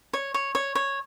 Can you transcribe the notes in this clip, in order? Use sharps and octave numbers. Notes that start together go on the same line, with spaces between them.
C#5
C#5
C#5
C#5